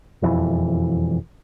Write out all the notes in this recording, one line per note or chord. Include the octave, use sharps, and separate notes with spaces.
E1 F2 E3